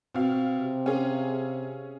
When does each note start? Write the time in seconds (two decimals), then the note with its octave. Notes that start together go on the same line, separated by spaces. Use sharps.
0.14 B2 C4 F5
0.55 C3
0.86 C#4 G#4 F5